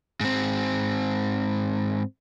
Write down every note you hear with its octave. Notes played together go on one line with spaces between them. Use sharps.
G#2 C4